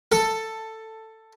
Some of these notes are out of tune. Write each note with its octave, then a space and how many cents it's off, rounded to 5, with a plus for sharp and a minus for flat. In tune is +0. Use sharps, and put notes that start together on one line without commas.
A4 +10